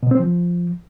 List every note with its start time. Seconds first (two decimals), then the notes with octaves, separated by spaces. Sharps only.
0.03 B2
0.11 C4
0.20 F3